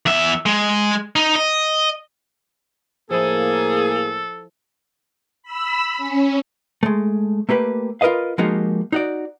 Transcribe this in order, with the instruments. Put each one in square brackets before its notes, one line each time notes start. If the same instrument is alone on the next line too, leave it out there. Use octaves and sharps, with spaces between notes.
[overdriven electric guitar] E2 E5
G#3
D#4
D#5
[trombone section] A2 A#3 [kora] F3 E4 [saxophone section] G#4 [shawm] A4
[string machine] B5 E6
C#4
[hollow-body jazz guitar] G#3 A3
A3 A#3 G4 B4
F4 A#4 B4 D#5 F5
F3 G#3 A#3 D#4 F#4 G4
D#4 F#4 D5